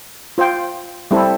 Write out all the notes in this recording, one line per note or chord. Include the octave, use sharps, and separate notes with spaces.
F4 C5 G5
G3 C4 E4 A4